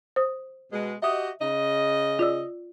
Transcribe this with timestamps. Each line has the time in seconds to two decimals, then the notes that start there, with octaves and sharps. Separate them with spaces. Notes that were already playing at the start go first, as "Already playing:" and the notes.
0.16 C5 D#6
0.71 B2 G#3
1.02 F#4 G4 D#5 E5 D#6
1.40 C#3 D#5
2.19 F4 D5 E6